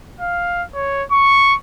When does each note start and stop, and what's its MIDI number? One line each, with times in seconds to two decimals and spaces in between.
0.20 0.64 77
0.75 1.04 73
1.11 1.56 85